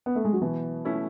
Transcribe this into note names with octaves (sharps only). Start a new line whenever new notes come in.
B3
A3
G#3
F#3
B2 E3
A3 C#4 E4